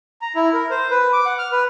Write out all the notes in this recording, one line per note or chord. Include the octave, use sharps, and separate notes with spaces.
A#5
E4
A#4
C5
B4
D6
F#5
F6
B4